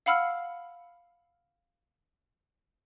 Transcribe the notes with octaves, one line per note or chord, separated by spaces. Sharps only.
F5 F#5 B5 E6 F6